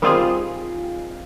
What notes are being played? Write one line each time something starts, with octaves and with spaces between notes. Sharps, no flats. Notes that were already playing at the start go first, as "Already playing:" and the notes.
D#3 G3 C4 F4 G#4